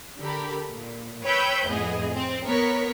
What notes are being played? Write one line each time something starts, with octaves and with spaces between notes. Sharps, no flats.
D3 G4 A4 A#4 B5
A#2
B4 C#5 G5 B5 E6 G6
F2 A2 B3 G#4 D#5
C4
B3 A#4 C#5 C#6 B6